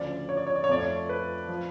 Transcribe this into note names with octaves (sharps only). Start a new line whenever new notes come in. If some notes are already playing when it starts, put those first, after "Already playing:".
Already playing: D2 C#3 F3 D5
C#5
D5
C#5
D5
C#5
F2 F3 A3 D5
C#5
B4
F3